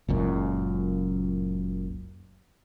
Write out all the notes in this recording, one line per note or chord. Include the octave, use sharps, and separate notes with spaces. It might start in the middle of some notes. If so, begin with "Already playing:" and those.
F#1 C#2 F#2 A#2